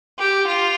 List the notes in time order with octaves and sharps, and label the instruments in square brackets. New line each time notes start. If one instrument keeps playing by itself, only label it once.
[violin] G4
F4